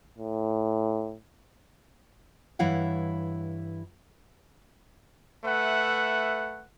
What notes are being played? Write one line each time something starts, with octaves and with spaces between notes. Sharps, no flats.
A2
G2 E3 E4 C#5 F5 F#5
A3 B4 E5 F#5